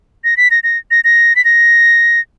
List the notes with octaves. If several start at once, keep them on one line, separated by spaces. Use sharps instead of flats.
A#6
B6
A#6
A#6
A#6
A#6
B6
A#6